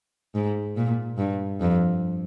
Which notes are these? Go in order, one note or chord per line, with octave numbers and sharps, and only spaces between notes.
G#2
A#2
G2
F2